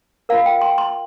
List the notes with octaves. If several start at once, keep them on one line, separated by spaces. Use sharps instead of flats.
F4 A#4 F5
G5
C6
C6